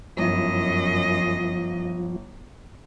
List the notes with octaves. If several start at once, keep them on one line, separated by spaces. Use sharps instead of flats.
G1 F#2 F3 E4 D#5